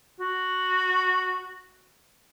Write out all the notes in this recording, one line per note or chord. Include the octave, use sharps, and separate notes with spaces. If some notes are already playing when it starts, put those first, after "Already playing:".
F#4